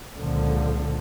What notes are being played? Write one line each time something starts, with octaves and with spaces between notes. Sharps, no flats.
C#2 A#2 D3 F3